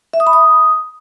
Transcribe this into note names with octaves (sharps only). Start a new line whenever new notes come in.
E5
D#6
B5
D#6